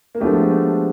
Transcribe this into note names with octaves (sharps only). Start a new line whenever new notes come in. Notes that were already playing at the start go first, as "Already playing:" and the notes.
A#3
F3 G#3 A3 B3 D4 G4
A3